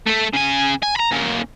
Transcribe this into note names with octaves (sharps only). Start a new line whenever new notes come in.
A3 A4
C#3 G#5
G#5
A#5 B5
A#3 C#4